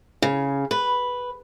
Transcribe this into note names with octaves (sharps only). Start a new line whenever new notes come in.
C#3
B4